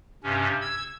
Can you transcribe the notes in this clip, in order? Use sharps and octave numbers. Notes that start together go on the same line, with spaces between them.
G2 C3 C#4
E6 G#6